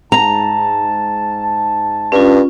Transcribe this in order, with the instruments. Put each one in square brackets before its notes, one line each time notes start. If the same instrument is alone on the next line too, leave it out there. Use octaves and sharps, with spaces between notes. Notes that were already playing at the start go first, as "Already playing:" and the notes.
[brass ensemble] G#2 A5 [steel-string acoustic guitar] A#5
[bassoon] G2 [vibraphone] C#4 F4